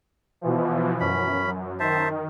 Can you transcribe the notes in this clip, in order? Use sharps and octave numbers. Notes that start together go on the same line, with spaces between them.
B2 E3 F3
F#2 C#4 B5
D#3 C5 E5 A5